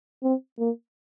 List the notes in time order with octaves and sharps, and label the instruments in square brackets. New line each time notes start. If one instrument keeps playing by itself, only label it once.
[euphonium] C4
A#3